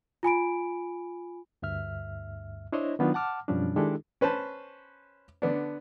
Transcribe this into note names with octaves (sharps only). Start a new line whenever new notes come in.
F4 G#5 B5 D7
D2 G2 E5 F6
D4 E4 C5 C#5 D#5
D#3 F#3 B3 D4 D#4 F4
F#5 A5 D6 F6
F#2 B2 F3 G3 C#4 D4
D#3 G#3 D4 E4 G4 A4
C#4 B4 C5 A5
D3 B3 D4